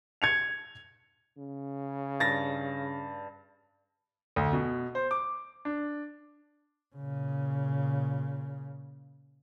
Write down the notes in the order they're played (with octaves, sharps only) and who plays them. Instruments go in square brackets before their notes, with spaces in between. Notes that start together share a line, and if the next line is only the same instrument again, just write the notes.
[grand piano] G#6 C#7 F7
[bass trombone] C#3
[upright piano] G2 A6 A#6
[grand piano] D2
B2
C5
D6
D4
[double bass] A#2 C#3